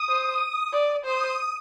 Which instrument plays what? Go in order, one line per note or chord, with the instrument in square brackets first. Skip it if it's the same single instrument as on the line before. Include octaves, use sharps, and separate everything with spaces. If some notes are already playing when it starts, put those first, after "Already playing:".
Already playing: [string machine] D#6
[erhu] C5
D5
[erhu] C5 [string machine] D#6